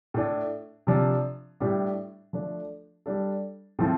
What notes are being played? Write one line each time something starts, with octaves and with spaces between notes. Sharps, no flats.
A2 A3 D4
C3 F3 D4
A2 G3 D4 G4
F3 A3 D4
G3 D4 A4
A2 F3 C4 A4